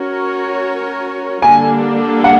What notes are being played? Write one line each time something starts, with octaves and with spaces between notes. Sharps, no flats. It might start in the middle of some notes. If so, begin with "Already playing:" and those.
Already playing: C#4 F#4 A#4 C#5
D3 G3 A#3 D4 G#5
F#5